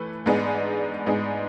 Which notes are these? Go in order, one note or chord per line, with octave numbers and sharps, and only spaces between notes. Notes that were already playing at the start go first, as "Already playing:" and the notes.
Already playing: E3 A3 B4
G#2 G#3 B3 D4 G#4
G#2 G#3 B3 D4 G#4